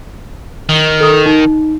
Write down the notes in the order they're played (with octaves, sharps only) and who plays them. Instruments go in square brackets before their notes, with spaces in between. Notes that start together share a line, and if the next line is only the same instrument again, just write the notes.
[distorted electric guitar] D#3
[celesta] A4 D#6
D#4